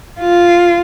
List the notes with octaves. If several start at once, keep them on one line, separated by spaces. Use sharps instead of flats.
F4